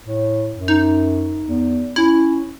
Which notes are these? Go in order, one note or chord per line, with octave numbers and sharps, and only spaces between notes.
A2
F#2
D#4
E2
C#4 E4